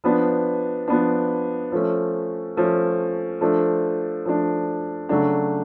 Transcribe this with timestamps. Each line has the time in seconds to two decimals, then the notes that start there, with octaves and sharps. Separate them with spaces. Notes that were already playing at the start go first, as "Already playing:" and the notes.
0.04 F3 B3 D4
0.88 F3 B3 D4
1.72 F3 A3 C#4
2.57 F3 A3 C#4
3.41 F3 A3 D4
4.26 F3 A3 D4
5.09 C#3 F#3 A3 D4